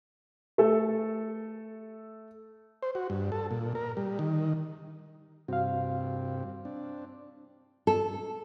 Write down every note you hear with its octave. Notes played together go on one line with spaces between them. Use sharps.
A3 A4
C5
F#4
G2
A4
A#2
A#4
G3
D#3
G2 C3 C4 F#4 F5
C4 D4
A4